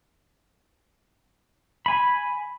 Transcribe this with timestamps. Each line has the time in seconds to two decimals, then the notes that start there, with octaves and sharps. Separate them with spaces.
1.86 G#5 B5